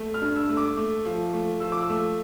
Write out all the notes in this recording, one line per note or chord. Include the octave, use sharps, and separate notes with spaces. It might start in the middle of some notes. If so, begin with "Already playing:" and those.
Already playing: A3
F6
G2
E6
A3
D6
A3
F3
A3
F3 E6
D6
E6
A3